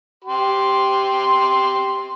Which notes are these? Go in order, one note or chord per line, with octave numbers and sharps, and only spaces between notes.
G4 C6